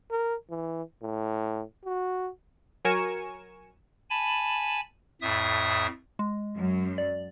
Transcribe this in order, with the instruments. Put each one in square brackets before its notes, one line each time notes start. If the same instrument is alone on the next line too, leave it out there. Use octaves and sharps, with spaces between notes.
[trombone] A#4
E3
A2
F#4
[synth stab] F#3 A#4 G#5 C#6 C#7 E7
[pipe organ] G#5 A5 B5
F2 A2 E5 D#6
[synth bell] G#3
[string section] F#2
[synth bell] D5